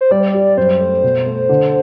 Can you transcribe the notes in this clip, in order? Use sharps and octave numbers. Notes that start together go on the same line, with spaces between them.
C5
G3 D5
G4
F#2 C5
A3
B2
A3
D3